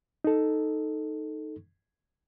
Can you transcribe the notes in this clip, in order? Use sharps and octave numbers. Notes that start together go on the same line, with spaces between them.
D#4 A4